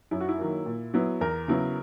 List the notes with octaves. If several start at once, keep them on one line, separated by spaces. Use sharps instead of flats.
F#2 E4
F#4
E4
D#3 F#3 A#3
A#2
F#3 B3 E4
E2 A#4
C#3 F#3 B3 E4